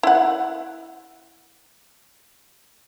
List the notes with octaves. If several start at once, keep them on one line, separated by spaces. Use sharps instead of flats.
E4 F#5